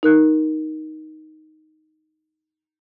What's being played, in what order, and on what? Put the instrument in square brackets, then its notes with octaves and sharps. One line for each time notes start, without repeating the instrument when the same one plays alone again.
[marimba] D#4 A#4 F#6